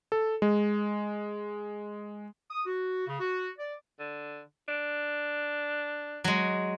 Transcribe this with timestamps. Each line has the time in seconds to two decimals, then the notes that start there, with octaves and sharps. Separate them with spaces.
0.12 A4
0.42 G#3
2.51 D#6
2.66 F#4
3.07 C#3
3.20 F#4
3.59 D5
4.00 D3
4.68 D4
6.24 F#3 G#3